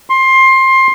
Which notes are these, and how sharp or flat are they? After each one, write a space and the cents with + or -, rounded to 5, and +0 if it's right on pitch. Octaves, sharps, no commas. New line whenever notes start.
C6 +20